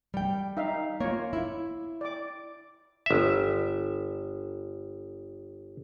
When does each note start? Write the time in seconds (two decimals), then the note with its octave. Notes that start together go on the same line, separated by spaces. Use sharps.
0.14 G3 G5
0.57 D#4 E5 F5
1.00 A#3 F4 C#5
1.33 E4
2.01 D5 D6
3.06 G1 E5